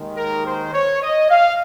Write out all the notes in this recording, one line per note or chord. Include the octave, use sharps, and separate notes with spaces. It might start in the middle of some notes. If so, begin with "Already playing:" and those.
Already playing: D#2 D#3 G#3
A#4
C5
C#5
D#5
F5